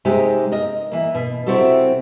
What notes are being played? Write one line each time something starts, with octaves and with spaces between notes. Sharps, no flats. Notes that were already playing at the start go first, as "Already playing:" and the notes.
C3 G#3 D#4 G4
A#4 D#5
E3 A#3
B2
C3 C4 E4 F#4 G4 A4